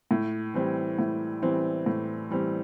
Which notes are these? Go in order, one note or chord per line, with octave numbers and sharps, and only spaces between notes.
A2
E3 G3 C4
A2
E3 G3 C4
A2
E3 G3 C4